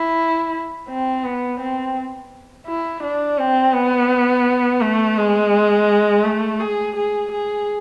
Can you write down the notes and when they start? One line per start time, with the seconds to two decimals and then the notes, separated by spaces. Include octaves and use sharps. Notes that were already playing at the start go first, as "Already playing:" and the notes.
Already playing: E4
0.88 C4
1.24 B3
1.60 C4
2.67 E4
3.03 D4
3.38 C4
3.74 B3
4.81 A3
5.17 G#3
6.25 A3
6.60 G#4
6.96 G#4
7.32 G#4